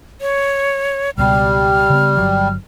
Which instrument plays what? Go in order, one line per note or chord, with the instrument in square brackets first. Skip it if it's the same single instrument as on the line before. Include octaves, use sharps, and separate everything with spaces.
[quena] C#5
[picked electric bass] C#2 B2 [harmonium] G3 [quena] F6
[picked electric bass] C#3 B3
G1 D#2 F#3